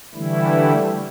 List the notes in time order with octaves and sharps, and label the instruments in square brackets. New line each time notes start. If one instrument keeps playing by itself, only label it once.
[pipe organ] D3 E3 G3 A3 E4